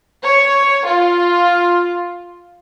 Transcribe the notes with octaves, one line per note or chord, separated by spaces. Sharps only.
C#5
F4